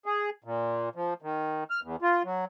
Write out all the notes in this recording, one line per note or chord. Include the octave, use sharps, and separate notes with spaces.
G#4
A#2
F3
D#3
F6
E2
F4
F#3